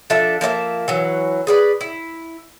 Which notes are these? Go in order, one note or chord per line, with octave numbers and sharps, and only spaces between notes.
F3 D4 A4 E5
F3 A#3 D#5 E5
E3 F#3
G#4 B4 D5
E4